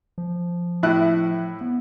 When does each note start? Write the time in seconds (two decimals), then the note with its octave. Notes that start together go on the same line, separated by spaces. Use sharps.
0.18 F3
0.83 A2 E4 F#6
1.61 B3